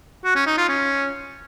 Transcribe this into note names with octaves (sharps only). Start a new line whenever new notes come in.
F#4
C#4
D#4
F4
C#4